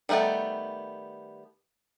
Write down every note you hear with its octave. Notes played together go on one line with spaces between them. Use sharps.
D#3 G3 A3 B3 A5